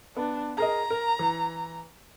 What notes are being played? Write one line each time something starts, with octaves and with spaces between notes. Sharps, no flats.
B3 D4
G#4 A#4 D#5 A#5
A#4
E3